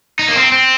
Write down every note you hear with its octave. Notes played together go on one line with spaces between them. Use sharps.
D#4
A#3
C4
C4